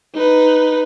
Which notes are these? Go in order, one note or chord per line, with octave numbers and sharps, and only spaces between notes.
D#4 B4